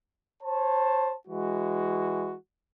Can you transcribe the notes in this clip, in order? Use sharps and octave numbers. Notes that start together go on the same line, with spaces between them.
C5 C#5 A5
E3 G#3 F#4